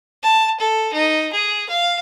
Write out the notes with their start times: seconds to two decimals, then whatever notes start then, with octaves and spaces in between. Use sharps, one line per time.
0.23 A5
0.60 A4
0.93 D#4
1.32 G#4
1.69 F5